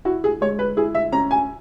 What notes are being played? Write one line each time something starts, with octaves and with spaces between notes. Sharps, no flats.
E4 F#4
G#4
G#3 C#5
B4
E4 G#4
E5
C#4 A#5
G#5